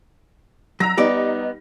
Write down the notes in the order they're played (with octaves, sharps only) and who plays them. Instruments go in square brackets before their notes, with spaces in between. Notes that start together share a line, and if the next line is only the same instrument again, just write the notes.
[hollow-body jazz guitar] F#3 [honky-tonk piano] A#5 E6 A#6
[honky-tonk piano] G3 D#4 [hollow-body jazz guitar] B3 D5